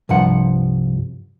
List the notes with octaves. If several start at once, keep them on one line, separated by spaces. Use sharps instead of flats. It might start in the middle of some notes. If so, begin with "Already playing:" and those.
C2 G2 F3 F#5